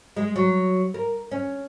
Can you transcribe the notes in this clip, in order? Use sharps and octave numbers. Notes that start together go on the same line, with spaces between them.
G#3
F#3
A#4
C#4